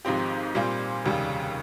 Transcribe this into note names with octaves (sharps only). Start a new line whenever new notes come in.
G#1 G#2 F3 C4 G4
A#2 G3 C4 F4
F1 D#2 C#3 G3